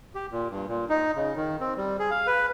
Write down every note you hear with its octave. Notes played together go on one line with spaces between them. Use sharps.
G4
A#2
G2
A#2
D#4
C#3
D#3
C4
G3
G#4
F5
B4